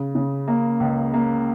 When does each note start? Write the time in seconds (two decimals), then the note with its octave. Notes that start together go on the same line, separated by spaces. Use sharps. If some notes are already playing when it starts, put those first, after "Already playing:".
Already playing: C#3
0.15 C#3
0.48 A#3
0.80 C#2
1.14 A#3